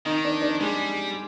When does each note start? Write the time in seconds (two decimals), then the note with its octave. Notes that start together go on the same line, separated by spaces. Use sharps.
0.06 D#3 D#4
0.25 D4
0.42 D4
0.61 G3 G#3